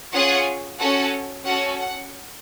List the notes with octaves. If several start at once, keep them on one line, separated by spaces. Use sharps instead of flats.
C#4 F4 G#4 F#5
C#4 F#4 A4 F#5
C#4 F#4 A4 F#5
F#5